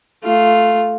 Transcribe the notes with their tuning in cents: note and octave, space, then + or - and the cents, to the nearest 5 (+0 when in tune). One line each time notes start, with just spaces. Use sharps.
A3 +0 F4 +0